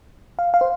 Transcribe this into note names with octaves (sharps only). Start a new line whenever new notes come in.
F5
F5
C5